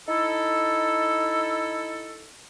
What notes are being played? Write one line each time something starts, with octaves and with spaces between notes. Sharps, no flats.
D#4 E4 A4